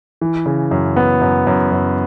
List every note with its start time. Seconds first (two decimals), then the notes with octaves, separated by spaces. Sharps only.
0.21 E3
0.46 C#3
0.71 F#2
0.96 B3
1.21 F#2
1.47 F#2
1.72 F#2